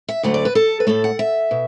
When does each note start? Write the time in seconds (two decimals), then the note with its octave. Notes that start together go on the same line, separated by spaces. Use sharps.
0.09 E5
0.23 D2 D3 F#3 A3 F#5
0.34 D5
0.45 B4
0.55 A4
0.80 B4
0.87 A2 A3 A4
1.04 F#5
1.19 E5
1.51 B2